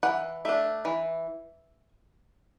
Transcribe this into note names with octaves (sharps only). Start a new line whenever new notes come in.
E3 F#5
A3 D4 E5
E3